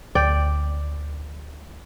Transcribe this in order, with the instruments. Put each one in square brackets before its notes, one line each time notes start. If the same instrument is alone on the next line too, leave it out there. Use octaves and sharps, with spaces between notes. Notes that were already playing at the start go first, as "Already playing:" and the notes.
[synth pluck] D2 [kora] D5 G5